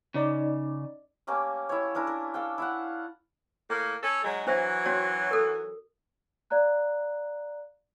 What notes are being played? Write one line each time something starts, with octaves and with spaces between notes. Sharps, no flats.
C#3 C#4 D#4 D5
A3 A#3 C#4 G4
E4 C#5
C#4 D4 E4 A#4
A#4
A4 F5 G5
E4 F5 F#5
A2 A#3
C#4 A4
G#2 F#3 G#3
E3 F#3 D4 C5 E5
C#4 F#4 C#5
A4 A#4
D5 F5 A#5 F#6